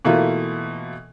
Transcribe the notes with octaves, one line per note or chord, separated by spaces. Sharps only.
B2 E3 A3 A#3 F4